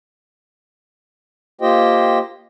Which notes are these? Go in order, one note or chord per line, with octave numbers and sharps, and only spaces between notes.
A#3 F4 G4 C5 D#5 G5